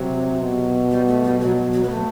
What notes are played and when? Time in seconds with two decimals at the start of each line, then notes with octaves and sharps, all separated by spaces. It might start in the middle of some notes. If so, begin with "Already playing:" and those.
Already playing: C3 F#3
0.41 B2
0.91 G3
1.07 A3
1.24 G3
1.40 B2 F#3
1.74 F#3
1.83 B3
1.90 A3